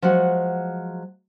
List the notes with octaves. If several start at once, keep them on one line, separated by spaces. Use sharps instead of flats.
F3 F#3 G#3 F#5